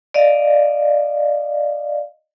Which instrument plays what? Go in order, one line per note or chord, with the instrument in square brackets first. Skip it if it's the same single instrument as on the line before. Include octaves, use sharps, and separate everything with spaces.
[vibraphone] D5 D#5 F5